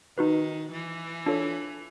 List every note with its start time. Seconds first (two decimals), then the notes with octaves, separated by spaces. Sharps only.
0.18 D#3 D#4 F#4 B4
0.72 E3
1.26 D4 F4 A4 C#5